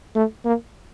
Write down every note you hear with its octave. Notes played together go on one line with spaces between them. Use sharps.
A3
A#3